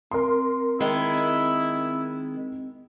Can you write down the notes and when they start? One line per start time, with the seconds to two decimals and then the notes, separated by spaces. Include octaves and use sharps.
0.11 C4 A#4 C6
0.80 D#3 G#3 E4